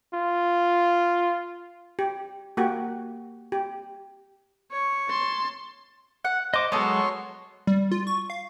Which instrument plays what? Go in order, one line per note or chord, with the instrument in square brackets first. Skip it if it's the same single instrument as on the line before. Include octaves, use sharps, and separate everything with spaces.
[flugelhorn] F4
[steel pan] G4
A#3 F#4 G4
G4
[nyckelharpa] C#5
[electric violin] A5 C6
[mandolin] F#5
[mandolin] C5 A#5 [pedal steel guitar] D#5 D6
[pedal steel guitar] F#3 G#3 [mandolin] B3 A4 [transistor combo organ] C#5 C6
[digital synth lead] G3
F4
C#6
F5